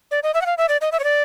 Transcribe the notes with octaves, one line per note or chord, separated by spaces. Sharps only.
D5
D#5
E5
F#5
F5
E5
D5
D#5
E5
C#5
D5